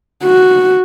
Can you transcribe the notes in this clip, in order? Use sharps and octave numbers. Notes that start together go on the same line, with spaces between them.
F#4